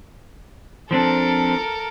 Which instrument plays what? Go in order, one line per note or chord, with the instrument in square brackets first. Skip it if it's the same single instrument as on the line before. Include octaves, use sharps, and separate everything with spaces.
[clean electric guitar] F3 C4 D4 [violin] A4 A#4